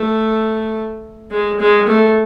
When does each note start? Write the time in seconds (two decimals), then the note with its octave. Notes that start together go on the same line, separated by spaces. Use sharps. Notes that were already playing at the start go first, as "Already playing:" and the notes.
Already playing: A3
1.31 G#3
1.60 G#3
1.88 A3